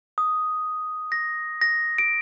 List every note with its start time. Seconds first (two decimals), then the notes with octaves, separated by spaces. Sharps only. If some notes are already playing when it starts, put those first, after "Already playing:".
0.18 D#6
1.12 A#6
1.61 A#6
1.98 D7